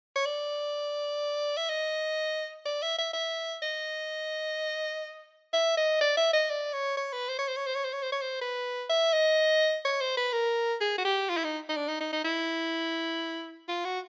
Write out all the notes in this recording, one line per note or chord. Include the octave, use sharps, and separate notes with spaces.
C#5
D5
E5
D#5
D5
E5
E5
E5
D#5
E5
D#5
D5
E5
D#5
D5
C#5
C#5
B4
C5
C#5
C5
C#5
C5
C#5
C5
C#5
C5
C#5
C5
B4
E5
D#5
C#5
C5
B4
A#4
G#4
F#4
G4
F4
E4
D#4
D#4
D4
D#4
D#4
D#4
E4
F4
F#4